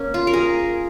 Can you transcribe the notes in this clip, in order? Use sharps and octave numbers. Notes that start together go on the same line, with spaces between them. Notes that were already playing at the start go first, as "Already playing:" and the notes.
Already playing: A#3 C#4
F4
A#4
G#4